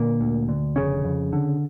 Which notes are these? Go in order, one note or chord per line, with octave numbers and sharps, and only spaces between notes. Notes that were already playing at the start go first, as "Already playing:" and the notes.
Already playing: A#2 D3 A#3
D2
D3
F1 C#3 C#4
F2
D3